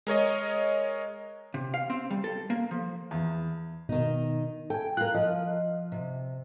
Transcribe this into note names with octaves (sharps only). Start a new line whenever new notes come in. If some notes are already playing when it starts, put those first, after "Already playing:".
G#3 A#4 C#5 D#5
C3
F5
C4
G3
A4
A#3
F3
E2
B2 D#3 D#4
A4 G5 G#5
F4 A#4 F#6
F3 F4 D#5
C3